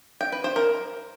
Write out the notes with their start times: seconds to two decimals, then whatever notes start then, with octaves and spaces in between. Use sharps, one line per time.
0.21 G5
0.32 B4
0.44 C5
0.56 A#4